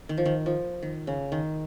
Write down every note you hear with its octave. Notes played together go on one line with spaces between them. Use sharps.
D#3
F3
D#3
F3
D#3
C#3
D#3